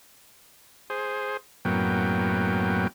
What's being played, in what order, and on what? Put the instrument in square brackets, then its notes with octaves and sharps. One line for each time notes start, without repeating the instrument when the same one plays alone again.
[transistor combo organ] G#4 C5
F#2 A2 F#3 A#3 B3 G5